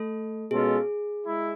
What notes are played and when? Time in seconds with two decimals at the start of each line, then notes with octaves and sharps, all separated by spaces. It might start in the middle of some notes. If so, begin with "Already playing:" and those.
Already playing: A3 A4
0.50 B2 G#3 C#4 F4 G#4 A4
1.25 G#3 E4